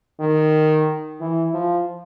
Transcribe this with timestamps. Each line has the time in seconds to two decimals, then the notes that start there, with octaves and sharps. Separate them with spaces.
0.20 D#3
1.21 E3
1.54 F3